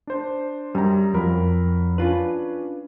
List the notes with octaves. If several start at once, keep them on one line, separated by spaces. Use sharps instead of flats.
D4 C5
F#2 G3 A#5
F2 F#3 A#4 B5
C#4 D4 F4 B4